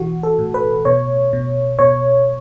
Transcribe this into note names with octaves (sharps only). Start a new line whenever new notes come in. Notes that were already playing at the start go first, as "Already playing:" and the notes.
Already playing: B2 E3 F#4
A4
A2
B4
B2 C#5
B2
B2 C#5